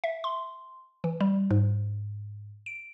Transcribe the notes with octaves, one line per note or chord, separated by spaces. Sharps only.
E5
C6
E3
G3
G#2
D7